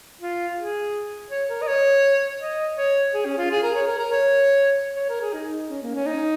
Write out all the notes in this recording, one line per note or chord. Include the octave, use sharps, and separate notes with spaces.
F4
G#4
C#5
A#4
D#5
C#5
D#5
C#5
G#4
C#4
F4
G#4
A#4
C#5
A#4
A#4
C#5
C#5
A#4
G#4
D#4
C#4
A#3
C#4
D#4